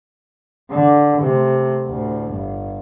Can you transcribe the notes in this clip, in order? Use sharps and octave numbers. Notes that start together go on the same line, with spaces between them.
D3
C3 A3
D2 A2
G1